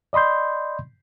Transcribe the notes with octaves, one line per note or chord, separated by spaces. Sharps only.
D5 D#5 B5 C6 G6